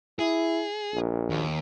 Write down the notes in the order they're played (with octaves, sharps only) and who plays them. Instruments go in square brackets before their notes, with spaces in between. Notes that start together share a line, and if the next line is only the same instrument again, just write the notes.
[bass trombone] E4 [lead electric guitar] G#4
[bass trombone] A#1
[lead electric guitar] D#2